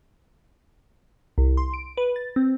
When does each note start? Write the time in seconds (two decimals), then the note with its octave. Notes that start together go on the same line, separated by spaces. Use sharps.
1.38 C2
1.57 C6
1.74 D7
1.97 B4
2.16 A6
2.36 C4